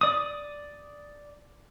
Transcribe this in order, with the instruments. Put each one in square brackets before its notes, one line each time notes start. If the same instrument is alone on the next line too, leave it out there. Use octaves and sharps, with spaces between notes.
[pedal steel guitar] D5 D#6